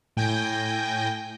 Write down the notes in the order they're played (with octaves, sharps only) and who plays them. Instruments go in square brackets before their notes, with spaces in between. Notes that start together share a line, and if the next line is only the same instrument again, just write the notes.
[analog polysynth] A2 G5 G#5 G6 A#6